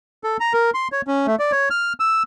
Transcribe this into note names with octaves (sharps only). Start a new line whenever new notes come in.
A4
A#5
A#4
C6
C#5
C#4
A3
D5
C#5
F6
E6